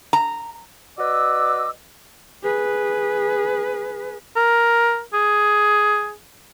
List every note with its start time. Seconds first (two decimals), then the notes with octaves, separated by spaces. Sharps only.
0.13 A#5
0.98 F#4 B4 D5 D#5 D6 E6
2.43 G#4 B4
4.36 A#4
5.14 G#4